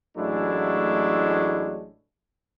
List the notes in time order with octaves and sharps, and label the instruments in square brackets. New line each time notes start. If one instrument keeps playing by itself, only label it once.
[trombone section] A1 F#3 G#3 A3 D4 E4